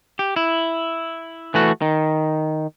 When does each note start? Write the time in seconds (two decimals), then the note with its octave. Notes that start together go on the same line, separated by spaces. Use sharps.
0.19 G4
0.36 E4
1.54 E3 A3 F#4
1.82 D#3